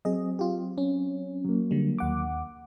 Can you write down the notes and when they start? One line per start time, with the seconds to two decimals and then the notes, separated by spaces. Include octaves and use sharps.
0.05 F#3 C4 G#4 D#5
0.39 F4 G4
0.78 C#4
1.45 F#3 A#3
1.71 D3 G3
1.98 D#2 F#5 D6